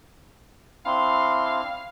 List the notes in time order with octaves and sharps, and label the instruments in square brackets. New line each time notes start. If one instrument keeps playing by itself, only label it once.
[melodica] C4 D4 E4 [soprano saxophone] F5 [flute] C6